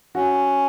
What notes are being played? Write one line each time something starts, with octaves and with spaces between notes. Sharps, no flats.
C#4 F#4